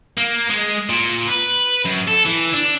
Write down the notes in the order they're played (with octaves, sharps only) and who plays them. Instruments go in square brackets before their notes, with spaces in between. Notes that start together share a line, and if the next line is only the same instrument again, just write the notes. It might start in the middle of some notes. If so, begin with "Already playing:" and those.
[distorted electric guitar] A#3
G#3
A#2
B4
F#2
A4
E3
D4